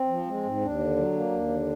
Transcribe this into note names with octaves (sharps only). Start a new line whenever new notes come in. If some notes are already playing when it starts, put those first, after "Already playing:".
Already playing: C4
F3
G#3
G#2
D#2 D4
D3
F#3
A#3
D#2
D3